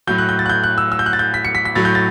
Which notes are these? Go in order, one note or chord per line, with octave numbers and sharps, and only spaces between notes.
A2 F#3 G6
F#6
G6
A6
F#6
G6
F#6
E6
E6
G6
F#6
A6
G6
B6
C#7
B6
B6
A2 F#3 A6
G6
A6